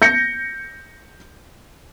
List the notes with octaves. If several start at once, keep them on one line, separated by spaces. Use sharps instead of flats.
G6 A#6 C#7